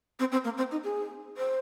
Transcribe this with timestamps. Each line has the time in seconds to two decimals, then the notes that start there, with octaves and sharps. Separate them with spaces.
0.19 C4
0.32 C4
0.44 A#3
0.58 C4
0.71 D#4
0.84 G#4
1.37 C5